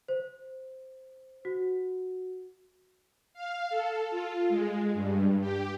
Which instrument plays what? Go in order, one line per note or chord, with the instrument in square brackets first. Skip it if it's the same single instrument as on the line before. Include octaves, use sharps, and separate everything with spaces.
[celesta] C5
F#4
[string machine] F5
A4
F4
G#3
G2
G4